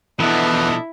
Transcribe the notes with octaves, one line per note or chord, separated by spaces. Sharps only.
B2 E3 F3 B3 D4 E4 A4 D#5